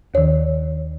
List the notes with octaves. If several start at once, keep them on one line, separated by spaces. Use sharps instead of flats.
D#2 D#3 C#5